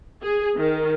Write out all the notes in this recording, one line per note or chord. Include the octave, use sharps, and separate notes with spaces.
G#4
D#3